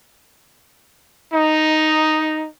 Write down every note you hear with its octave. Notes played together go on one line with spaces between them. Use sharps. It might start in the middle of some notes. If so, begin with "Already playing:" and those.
D#4